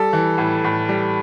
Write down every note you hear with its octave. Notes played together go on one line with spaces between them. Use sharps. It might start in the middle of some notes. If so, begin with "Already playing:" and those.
Already playing: G3 A4
E3
A2
A2
G3